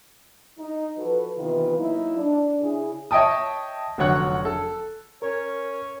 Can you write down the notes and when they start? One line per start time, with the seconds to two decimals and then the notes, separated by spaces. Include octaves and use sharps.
0.59 D#4
0.98 F3 F#4 A4 B4
1.38 C3 D#3 E3 B3 F4 B4
1.77 F#3 A#3 D#4 E4
2.17 D4
2.61 C#3 E4 G#4
3.11 C#5 D#5 E5 G5 A5 D#6
3.98 F1 D3 F#3 C#5 F#5 F#6
4.45 A4
5.22 C#4 A#4 C#5